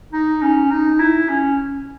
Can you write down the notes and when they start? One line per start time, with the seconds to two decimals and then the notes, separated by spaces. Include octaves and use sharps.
0.13 D#4
0.42 C#4
0.71 D#4
1.00 E4
1.29 C#4